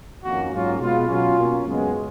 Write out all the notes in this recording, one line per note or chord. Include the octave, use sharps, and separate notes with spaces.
F2 D#3 A#3 C#4 F#4
G#2 F#3 A#3 C#4 F4
B2 G#3 B3 F4
B2 F#3 C#4 F4
B2 A#3 C#4
F#2 C#3 G#3 B3